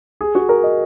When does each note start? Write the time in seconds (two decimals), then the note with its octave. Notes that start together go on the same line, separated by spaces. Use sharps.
0.21 G#4
0.35 F#4
0.49 A#4
0.64 D#5